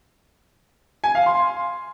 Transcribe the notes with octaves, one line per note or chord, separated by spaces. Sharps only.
G#5
F5
C6